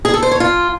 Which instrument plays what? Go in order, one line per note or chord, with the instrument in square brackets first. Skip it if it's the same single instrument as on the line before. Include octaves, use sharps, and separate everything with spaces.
[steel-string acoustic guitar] G#4
A4
C5
C#5
F4